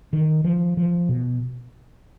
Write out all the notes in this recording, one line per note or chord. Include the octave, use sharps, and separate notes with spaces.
D#3
F3
F3
B2